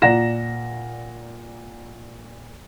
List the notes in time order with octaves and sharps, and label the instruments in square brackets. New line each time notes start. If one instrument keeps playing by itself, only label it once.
[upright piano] A#2 D5 F#5 A#5 A#6 E7